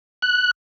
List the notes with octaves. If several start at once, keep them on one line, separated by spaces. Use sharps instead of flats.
F#6